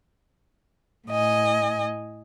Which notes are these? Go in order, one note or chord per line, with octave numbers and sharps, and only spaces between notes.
A2 D#5 G#5